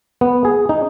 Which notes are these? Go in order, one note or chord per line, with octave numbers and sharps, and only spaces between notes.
B3
G#4
D#4